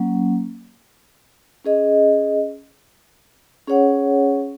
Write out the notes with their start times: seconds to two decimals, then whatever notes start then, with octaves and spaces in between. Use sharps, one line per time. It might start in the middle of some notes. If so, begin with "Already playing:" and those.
Already playing: F#3 A#3 C#4
1.65 C#4 G#4 D#5
3.67 C#4 G#4 C#5 F#5